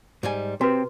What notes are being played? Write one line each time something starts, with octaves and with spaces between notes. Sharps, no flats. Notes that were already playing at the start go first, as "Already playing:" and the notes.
G#2 G3 G#5
C3 C4 F#4 B4